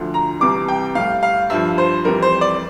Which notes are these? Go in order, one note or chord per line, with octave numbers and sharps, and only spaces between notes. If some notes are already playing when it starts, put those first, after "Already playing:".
Already playing: D2 D3 F3
A#5
C2 C3 E3 G3 D6
G5
A2 G3 F5
F5
G2 F3 E5
C5
F2 E3 G3 A#4
C5
D5